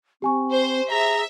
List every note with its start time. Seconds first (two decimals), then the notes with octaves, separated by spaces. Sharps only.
0.22 C4 G4 G#5 C#6
0.51 C5
0.91 G#4 E5 A#5